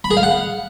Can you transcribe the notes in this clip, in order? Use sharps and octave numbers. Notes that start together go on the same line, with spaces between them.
B5
G#4
F5
F#5